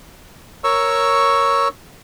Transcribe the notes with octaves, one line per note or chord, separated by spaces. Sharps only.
A#4 C#5 C#6 E6